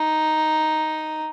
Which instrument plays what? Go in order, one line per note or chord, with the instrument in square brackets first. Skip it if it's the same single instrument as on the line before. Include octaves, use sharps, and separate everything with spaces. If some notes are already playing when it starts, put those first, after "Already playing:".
Already playing: [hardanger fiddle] D#4